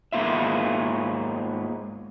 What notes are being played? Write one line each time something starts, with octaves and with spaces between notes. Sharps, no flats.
G#2 G#3 A#3 B3 F4 E5